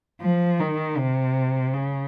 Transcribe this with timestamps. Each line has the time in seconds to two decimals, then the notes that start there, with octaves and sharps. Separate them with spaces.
0.21 F3
0.60 D#3
0.97 C3
1.74 C#3